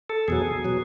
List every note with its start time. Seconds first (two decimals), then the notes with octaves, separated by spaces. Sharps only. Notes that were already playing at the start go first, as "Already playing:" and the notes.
0.10 A4
0.28 E2 B2 F#3 G#4
0.65 B2 F#3